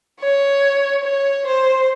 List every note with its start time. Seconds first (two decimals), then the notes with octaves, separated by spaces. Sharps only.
0.20 C#5
1.04 C#5
1.46 C5